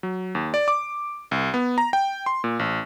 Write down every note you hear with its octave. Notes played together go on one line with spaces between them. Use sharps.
F#3
D#2
D5
D6
C2
B3
A#5
G5
C6
A#2
A1